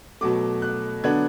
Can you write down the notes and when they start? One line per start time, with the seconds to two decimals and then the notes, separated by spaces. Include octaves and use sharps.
0.21 B2 F#3 A3 D6
0.62 F#6
1.03 D3 F#3 B3 D4 G#6